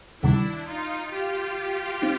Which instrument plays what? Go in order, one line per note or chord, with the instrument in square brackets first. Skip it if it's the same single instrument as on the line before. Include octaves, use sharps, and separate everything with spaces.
[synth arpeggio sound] D2 C3 D#3 G3 [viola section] D4 E4
[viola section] D#4 F4
F4 G4
[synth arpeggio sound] C4 D#4